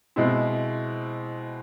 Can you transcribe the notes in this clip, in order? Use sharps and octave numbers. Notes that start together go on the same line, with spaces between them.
B2 G#3 C4 E4